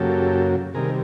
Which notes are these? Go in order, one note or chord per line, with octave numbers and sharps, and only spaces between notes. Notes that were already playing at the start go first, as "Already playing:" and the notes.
Already playing: F#2 C#3 F#3 A#3 G4 A4
C3 D#3 G3 G#4 A#4